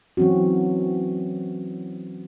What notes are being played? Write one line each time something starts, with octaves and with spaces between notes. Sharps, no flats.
E3 F#3 C4 C#4 F#4